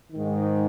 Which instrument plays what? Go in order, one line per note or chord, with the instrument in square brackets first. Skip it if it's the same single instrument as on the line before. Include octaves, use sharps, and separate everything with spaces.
[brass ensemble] G#2 D#3